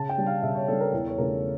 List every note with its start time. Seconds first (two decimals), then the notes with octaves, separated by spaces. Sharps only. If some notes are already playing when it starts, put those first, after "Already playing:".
Already playing: C#3 A5
0.09 G5
0.18 G3 D4
0.26 F5
0.43 C#3 E5
0.55 C#5
0.68 G3 D4 A4
0.80 A#4
0.93 E2 A4
1.07 C#5
1.18 C#3 F3 A3 D4 A#4